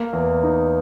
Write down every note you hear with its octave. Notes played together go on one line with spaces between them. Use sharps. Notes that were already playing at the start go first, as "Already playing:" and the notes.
Already playing: A#3
E2
D#4